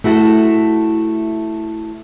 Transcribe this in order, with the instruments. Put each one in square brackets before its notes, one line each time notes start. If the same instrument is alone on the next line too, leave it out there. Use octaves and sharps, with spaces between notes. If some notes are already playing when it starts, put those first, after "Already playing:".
[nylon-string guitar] A3 E4 F#4 A4